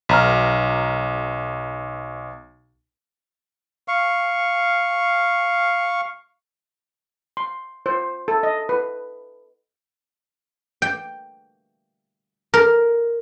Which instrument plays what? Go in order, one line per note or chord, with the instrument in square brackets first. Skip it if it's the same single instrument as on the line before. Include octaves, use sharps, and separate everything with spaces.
[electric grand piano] B1 A#5 F6
[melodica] F5 C#6
[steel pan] C6
C5
A4
D#5
B4
[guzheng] G5
A#4